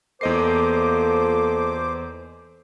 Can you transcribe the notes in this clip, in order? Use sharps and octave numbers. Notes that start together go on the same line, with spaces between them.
E2 A#3 F4 A4 C5 D#5 D6 C7